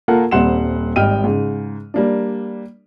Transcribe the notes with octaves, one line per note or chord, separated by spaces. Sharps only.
A#3 F4 A4 A#4 F#5
D#1 G3 C4 F#5 C6 E7
G#1 G3 D#5 G5 F6 D#7
G#2 C#3
G3 A#3 D4